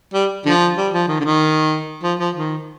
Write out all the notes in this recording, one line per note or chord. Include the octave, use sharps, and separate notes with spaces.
G3
D3 F3
G3
F3
D#3
D3
D#3
F3
F3
D#3